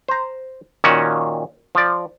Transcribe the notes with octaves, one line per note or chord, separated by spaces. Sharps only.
C5 A#5
A#2 D#3 C#4 F#4
F3 D5